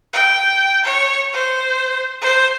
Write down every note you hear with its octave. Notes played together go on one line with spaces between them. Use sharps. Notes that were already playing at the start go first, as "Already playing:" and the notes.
G5
C#5
C5
C5